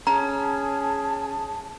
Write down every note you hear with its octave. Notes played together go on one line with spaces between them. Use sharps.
C#4 G#4 A5 A#5